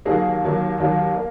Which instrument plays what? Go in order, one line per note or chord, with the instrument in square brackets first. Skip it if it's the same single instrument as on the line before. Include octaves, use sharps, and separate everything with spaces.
[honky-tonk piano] D#2 D#3 F#3 A#3 G#4
D#2 D#3 F#3 A#3
D#2 D#3 F#3 A#3
A#3